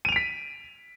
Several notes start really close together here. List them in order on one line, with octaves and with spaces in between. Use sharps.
D#7 F7 D7 B6